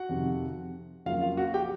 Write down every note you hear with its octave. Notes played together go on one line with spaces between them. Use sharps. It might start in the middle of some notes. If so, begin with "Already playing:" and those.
Already playing: F#4 F#5
F2 C3 D#3
F2 C#3 F#3 A#3 F4 F5
F4 F5
F#4 F#5
G4 G5